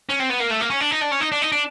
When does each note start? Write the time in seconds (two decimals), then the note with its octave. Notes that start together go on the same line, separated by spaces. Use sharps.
0.10 C#4
0.20 C4
0.30 B3
0.40 A#3
0.50 A3
0.61 A#3
0.70 C#4
0.81 D4
0.91 D#4
1.01 D4
1.12 C#4
1.21 D#4
1.32 D4
1.42 D#4
1.52 D4